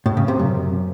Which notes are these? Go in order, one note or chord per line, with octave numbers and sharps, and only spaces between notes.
A2
C#3
C3
F#2